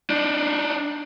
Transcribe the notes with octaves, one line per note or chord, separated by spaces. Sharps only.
D4 D#4